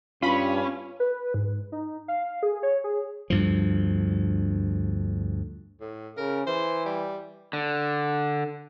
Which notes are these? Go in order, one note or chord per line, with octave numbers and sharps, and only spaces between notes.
G2 C#4 F4 B5
B4
G#2
D#4
F5
G#4
C#5
G#4
D2 G2 F3
A2
C#3 A#4
E3 C5
G3
D3